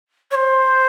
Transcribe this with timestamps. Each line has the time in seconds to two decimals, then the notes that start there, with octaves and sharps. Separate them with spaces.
0.31 C#5
0.35 C5